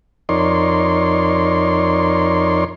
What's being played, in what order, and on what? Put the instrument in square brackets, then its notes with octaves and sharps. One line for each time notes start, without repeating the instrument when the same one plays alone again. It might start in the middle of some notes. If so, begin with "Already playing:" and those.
[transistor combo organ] F2 D#4 A#4 C#5 D5 C6